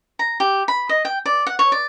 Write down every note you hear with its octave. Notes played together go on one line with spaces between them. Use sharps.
A#5
G4
B5
D#5
G5
D5
F#5
C#5
D5